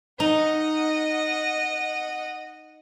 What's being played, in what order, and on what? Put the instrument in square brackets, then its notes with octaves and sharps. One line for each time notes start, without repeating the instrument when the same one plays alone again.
[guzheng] D#4 [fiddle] D#5 F#5